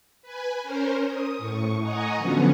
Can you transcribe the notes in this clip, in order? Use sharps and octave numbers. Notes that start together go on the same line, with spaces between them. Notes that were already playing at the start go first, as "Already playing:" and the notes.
B4 G#5
C#4 A#4 C5
D#6
A2 C#6
D#5 F#5 G#5 A#5 C#6 D#6
D3 F3 F#3 B3 C#4